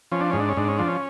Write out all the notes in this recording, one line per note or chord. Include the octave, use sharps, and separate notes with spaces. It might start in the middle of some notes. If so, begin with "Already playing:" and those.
F3 C#4
D4
G#2 C#4
D4
C#4
G#2 D4
C#4
F3 D4
C#4